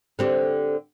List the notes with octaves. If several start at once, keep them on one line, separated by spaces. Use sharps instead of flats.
D3 C4 G4